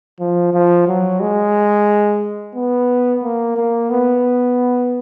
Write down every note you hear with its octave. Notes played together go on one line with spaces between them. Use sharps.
F3
F3
F#3
G#3
B3
A#3
A#3
B3